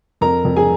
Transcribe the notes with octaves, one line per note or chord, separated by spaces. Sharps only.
F2 A#4 A#5
F2
G#4 G#5